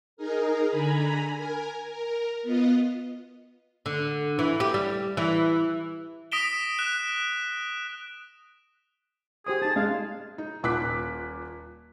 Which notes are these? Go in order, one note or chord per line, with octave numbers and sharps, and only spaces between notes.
D#4 G#4 A#4
D3 G#5 A#5 B5
A#4 G#5
A#4
B3 F4 D#5
D3
E3
G4
G3
E3
D#6 A#6 B6 D7 E7 G7
F#6 E7
G4 G#4 C5 D#6
D#4 G#4 A5
G#3 F5
D#4
D#1 A#2 D6 F#6 B6